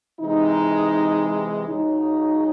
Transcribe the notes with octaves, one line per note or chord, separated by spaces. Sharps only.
C3 E3 G#3 D#4
C#2 C#3 F#3 D#4